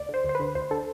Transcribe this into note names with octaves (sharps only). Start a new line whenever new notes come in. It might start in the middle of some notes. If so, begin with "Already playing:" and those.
Already playing: D2 D5
D3
C5
D2 C5
D3 B4
D2 C5
D3 A4